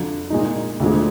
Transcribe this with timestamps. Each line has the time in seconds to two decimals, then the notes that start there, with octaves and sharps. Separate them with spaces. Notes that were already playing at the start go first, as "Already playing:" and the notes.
Already playing: F2 D3 F#3
0.30 A#2 G#3 D#4
0.80 D2 D3 F3 G#3